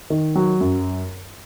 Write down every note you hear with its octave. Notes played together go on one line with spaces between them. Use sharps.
D#3
F#3
F#2